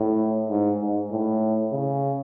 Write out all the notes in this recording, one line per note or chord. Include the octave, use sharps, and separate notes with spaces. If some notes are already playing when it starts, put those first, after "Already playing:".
Already playing: A2
G#2
G#2
A2
C#3